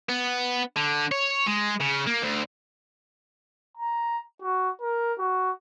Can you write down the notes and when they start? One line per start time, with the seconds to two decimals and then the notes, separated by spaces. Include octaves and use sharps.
0.09 B3
0.76 D3
1.11 C#5
1.47 G#3
1.81 C#3
2.07 A#3
2.22 D2
3.77 A#5
4.42 F#4
4.82 A#4
5.19 F#4